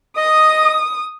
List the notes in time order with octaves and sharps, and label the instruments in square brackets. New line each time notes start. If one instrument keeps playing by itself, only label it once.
[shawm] D#5 [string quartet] D#6